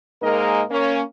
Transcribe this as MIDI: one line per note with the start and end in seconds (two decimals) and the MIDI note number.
0.22 0.62 44
0.22 0.62 56
0.22 0.62 58
0.22 0.62 63
0.22 0.62 70
0.22 0.62 75
0.70 1.01 58
0.70 1.01 61